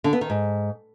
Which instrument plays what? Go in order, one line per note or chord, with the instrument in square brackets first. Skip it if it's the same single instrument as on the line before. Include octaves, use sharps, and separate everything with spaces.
[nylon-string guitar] D3
B3
D#3
G#2